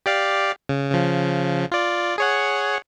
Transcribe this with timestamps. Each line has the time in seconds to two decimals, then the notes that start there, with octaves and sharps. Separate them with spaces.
0.06 G4 D5 F5
0.69 C#3
0.91 C#3 F3
1.72 F4 D5
2.18 G#4 C#5 F#5